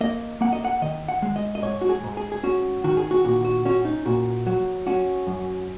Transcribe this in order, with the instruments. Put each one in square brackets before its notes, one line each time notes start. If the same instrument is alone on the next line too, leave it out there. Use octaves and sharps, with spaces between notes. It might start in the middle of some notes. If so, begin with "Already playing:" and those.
[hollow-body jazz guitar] A#3 D#5
A#3 F#5
D#5
F#5
D#3 D#5
F#5
G#3
D#5
D#5
G#2 C#5
F#4
G#4
G#2
G#4
G#4
C#4 F#4
D#3 F#4
G#4
F#4
A#2 F#4
F#4
C#4 F#4
D#4
A#2 F#4
F#3
C#4 F#4
F#2